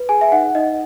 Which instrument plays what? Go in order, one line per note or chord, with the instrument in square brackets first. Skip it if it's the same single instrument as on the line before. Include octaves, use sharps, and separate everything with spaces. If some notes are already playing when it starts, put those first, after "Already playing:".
Already playing: [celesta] B4
G#4 G#5
E5
D#4 F#5
D#4 D#5